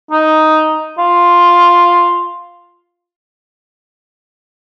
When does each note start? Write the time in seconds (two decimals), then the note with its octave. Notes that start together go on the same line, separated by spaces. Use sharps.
0.11 D#4
0.98 F4